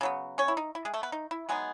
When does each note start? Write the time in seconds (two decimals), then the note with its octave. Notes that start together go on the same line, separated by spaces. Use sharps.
0.01 C#3 F#3 B3
0.38 C#4 C#5
0.48 E4
0.57 D#4
0.75 E4
0.85 G#3 G#4
0.94 A3 A4
1.03 B3 B4
1.12 D#4
1.31 E4
1.49 F#3 G#3 B3 D#4 G#4